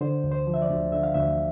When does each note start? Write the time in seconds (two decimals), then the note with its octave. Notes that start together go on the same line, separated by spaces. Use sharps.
0.01 D3 C5
0.24 D2
0.32 C5
0.47 F3
0.54 E5
0.62 D5
0.70 D2
0.92 D3 E5
1.03 F5
1.14 D2 E5